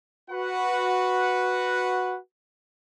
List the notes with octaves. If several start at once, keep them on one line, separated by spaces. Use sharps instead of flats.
F#4 B4 F#5